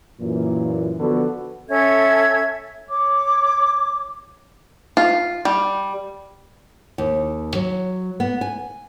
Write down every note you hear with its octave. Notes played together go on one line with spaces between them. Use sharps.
F#2 A#2 E3
D3 F3 B3 D4 F#4 A4
C#4 A4 E5 G#6
C#5 D6
F4
G3
D#2
F#3
B3
G#5